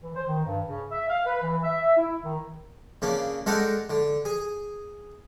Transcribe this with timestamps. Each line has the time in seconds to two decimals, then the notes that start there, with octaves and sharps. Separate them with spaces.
0.02 E3
0.15 C5
0.27 D#3
0.45 G2
0.67 C#3
0.91 E5
1.09 F5
1.25 B4
1.42 E3
1.63 E5
1.97 E4
2.24 D#3
3.02 C#3 A#3 D4
3.46 G#3 D4 A4 A#4 F#5 G5
3.90 D3
4.25 G#4